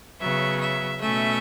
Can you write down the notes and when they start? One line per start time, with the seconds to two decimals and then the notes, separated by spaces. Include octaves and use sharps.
0.19 C#3 F#3 B3 E5
0.60 E5
1.00 B2 A3 C#4 E5